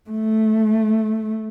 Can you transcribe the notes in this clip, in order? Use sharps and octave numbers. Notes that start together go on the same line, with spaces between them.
A3